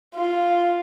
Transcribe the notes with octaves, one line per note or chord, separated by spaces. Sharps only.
F4